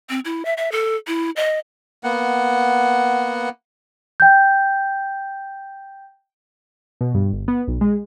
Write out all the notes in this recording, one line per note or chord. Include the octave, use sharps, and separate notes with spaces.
C4
E4
E5
E5
A4
E4
D#5
A#3 B3 F#5
G5 G6
B2
G2
G1
B3
B1
G#3